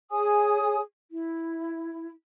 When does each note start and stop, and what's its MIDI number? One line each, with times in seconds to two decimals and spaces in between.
0.11 0.80 68
0.11 0.80 73
0.11 0.80 80
0.11 0.80 87
1.10 2.10 64